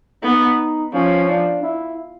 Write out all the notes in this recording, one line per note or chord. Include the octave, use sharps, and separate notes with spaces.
B3 D#4
F3 C#4
D4
E4